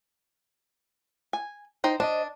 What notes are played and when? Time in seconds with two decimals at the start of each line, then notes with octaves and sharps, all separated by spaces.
1.33 G#5
1.84 D#4 C5 G5
2.00 D4 C5 D5 D#5